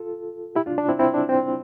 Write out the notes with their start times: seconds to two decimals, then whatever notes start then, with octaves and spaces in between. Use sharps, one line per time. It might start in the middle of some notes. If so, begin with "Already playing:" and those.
Already playing: F4 A4
0.55 E4 G4
0.66 D4 F4
0.78 D4
0.89 C4 E4
0.99 C4 E4
1.14 D4
1.29 C4